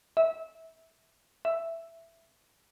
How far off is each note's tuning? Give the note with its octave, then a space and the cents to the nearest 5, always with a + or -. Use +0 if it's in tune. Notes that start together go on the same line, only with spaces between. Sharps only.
E5 -15
E5 +10